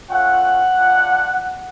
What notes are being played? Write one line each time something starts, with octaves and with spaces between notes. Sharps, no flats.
A3 C#4 F4 F#5
G#3 D4 F4